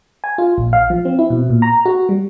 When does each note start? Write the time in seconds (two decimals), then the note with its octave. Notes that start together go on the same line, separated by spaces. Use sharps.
0.24 G#5
0.38 F4
0.58 A#1
0.73 F5
0.90 F3
1.05 C4
1.19 E4
1.30 B2
1.50 A#2
1.62 A#5
1.85 F#4
2.09 G3